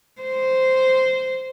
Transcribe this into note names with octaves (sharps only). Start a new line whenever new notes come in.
C5